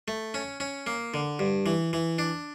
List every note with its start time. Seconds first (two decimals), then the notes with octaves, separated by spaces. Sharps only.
0.08 A3
0.34 C#4
0.60 C#4
0.87 A#3
1.14 D3
1.39 G2
1.66 E3
1.93 E3
2.19 D4